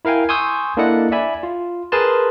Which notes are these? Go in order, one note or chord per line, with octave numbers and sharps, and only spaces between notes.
E4 A#4 F5 G5 G#5
G#5 C6 C#6 D#6 E6 G6
A#3 D4 E4 A4 D#5 F#5
D5 E5 G#5 B5
F4
G#4 A#4 B4 G#5 A5 C6